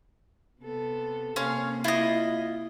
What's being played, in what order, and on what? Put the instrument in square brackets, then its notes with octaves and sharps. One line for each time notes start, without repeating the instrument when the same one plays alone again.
[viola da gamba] C3 B3 A4
[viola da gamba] C3 A#3 [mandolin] C#4 F5 C6
[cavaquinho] E4 B5 [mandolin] F4 D#5